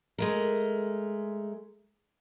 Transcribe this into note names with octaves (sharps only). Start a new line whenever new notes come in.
G#3 A3 A#4